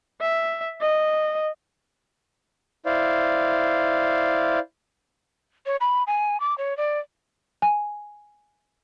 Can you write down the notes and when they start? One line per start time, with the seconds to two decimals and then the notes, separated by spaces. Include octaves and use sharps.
0.21 E5
0.81 D#5
2.86 E4 C5 D5 F5
5.66 C#5
5.81 B5
6.07 G#5
6.40 D6
6.58 C#5
6.77 D5
7.62 G#5